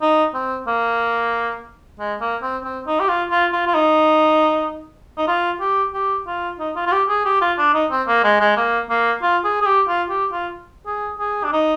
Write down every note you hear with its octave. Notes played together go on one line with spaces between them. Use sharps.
D#4
C4
A#3
G#3
A#3
C4
C4
D#4
G4
F4
F4
F4
F4
D#4
D#4
F4
G4
G4
F4
D#4
F4
F4
G4
G#4
G4
F4
D4
D#4
C4
A#3
G#3
G#3
A#3
A#3
F4
G#4
G#4
G4
F4
G4
F4
G#4
G#4
D4
D#4